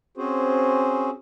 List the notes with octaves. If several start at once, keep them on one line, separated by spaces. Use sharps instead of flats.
C4 C#4 F#4 G#4 C5